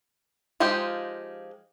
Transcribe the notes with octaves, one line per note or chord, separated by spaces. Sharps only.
F3 G#3 D#4 F4 G4